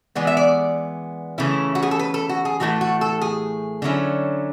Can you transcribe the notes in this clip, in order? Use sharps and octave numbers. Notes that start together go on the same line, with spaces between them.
E3 G#3 B3 D5
E5
D5
C#3 E3 A3 C#4 E4
F#4
G#4
A4
B4
A4
F#4
G#4
A2 E3 A3 E4 F#4
F#4
A4
G#4
D3 F#3 C#4 E4